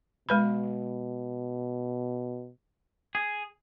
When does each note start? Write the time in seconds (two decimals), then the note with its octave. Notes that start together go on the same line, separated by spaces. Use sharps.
0.29 B2 G#3 B4 B5
3.15 G#4